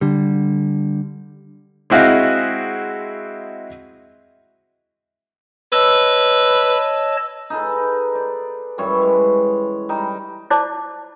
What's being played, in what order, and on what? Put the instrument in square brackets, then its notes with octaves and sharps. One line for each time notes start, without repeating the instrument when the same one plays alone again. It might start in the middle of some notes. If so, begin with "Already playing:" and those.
[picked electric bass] D3 G3
[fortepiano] G#3 C4 E4 F#4 D#5 F5
[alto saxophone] B4 [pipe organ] C#5 D#5 A5 [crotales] E6
[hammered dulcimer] D#4 G#4 A4 B4
D5
F#2 E3 G3 C#5
G#3
G3 D#4 G5 A#5
[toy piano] E4 F4 C5 D5 A5 D6